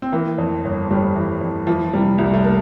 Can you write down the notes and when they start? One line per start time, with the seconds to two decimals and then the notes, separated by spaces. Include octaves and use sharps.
0.02 C4
0.12 E3 A#3
0.38 F2
0.65 G1
0.91 G1 G3
1.15 E3
1.41 F2
1.67 E3 F3
1.94 C3 G3
2.18 C2 G3
2.34 A3
2.44 A#3